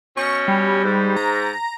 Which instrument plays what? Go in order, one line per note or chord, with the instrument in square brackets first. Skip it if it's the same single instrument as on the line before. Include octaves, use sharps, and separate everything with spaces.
[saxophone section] B2 C#4 [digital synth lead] C#6
[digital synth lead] G3
[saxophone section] G#2
[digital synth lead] A#5